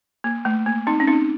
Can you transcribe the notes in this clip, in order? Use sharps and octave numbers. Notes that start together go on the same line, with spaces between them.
A#3
A3
A#3
C4 D#4
C#4
C4 D#4